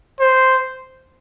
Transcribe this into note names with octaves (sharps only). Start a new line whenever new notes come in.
C5